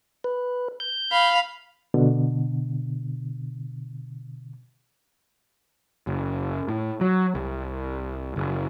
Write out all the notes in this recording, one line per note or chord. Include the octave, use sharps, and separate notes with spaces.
B4
G6
F5 B5
B2 D3
F#1
A2
F#3
C2
F#1